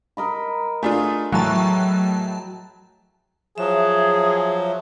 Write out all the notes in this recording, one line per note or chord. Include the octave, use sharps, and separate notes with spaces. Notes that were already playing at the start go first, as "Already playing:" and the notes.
A#4 D#5 B5
A3 D4 F4 G#4
A2 E3 F#3 G5 A5 A#5
F3 F#3 G#4 E5